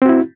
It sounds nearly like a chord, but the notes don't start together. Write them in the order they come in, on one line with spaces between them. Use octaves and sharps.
C4 F#4 E4